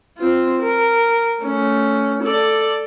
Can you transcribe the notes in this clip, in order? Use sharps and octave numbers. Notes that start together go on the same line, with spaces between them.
C4 F4
A#4
A3 C#4
A4 D5